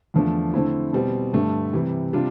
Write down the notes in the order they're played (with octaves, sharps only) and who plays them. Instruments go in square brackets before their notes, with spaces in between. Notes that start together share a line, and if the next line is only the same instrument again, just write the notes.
[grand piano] E2 D3 F3 A3 D4
D3 A3 C4 E4
B2 G3 C4
G2 D3 A3
C3 E3 G3
C3 G3 D4 F4